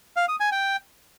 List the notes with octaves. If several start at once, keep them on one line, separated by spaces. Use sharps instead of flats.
F5
D#6
G#5
G5